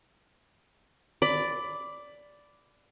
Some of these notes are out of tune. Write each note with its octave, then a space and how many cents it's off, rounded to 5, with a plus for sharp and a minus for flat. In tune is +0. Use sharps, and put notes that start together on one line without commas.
D5 -5 B5 +15